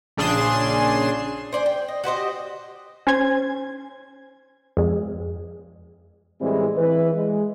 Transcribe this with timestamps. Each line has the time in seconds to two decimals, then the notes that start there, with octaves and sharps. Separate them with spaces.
0.17 A#1 C#3 D4 G#4 C6 E7
1.53 C5 D5 G#5
1.66 G5
1.88 D#5
2.04 F#4 G4 C5 D#5
3.07 C#4 C5 G#6
4.77 F2 G#3
6.41 A2 E3 G3 G#3 C4
6.77 E3 B4
7.14 G#3